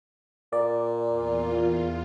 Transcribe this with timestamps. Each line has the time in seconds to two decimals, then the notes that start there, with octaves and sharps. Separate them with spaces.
0.53 A#2 D5
1.08 E2 F4